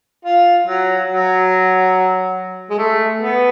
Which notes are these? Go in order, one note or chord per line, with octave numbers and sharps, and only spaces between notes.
F4
F#3
F#3
G#3
A3
B3